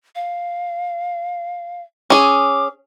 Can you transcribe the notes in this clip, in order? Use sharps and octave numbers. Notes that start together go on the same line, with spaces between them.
F5
C#4 G#4 D6